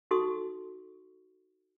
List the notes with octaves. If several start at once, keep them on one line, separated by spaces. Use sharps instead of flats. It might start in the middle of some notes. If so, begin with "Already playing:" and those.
D#4 F#4 A4 C6 C#6 D#6